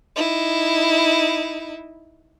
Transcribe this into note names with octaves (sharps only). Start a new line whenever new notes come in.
D#4 E4